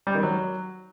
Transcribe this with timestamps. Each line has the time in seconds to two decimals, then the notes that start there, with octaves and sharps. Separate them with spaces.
0.07 G3
0.15 D#3
0.23 F#3